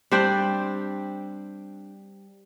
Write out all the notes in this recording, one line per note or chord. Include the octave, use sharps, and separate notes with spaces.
G3 C4 D4 G5